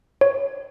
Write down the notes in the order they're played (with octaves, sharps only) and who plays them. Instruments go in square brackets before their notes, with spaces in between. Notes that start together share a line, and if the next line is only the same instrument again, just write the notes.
[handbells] C#5